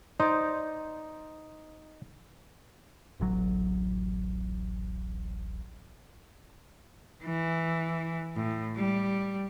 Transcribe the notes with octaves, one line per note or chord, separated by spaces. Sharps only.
D#4 C5 D5
D1 A1 F#3
E3
A2
G3